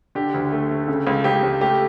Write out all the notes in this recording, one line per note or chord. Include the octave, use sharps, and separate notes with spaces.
D3 G4
D2
A3
A3
C#3
C#2
C#2 G4
C#2
A3 G4